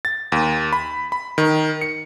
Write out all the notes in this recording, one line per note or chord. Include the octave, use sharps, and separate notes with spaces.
A6
D#2
B5
B5
D#3
C#7